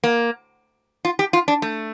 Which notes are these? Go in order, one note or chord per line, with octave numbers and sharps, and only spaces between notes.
A#3
F4
G4
F4
D4
A3